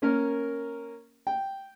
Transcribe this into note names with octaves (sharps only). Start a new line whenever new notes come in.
A#3 C#4 A#4
G5